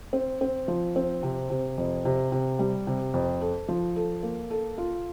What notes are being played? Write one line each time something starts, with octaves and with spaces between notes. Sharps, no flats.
C4
C4
F3
C4
C3
C3
F2
C3
C3
G3
C3
F2
A4
F3
A4
A#3
A4
F4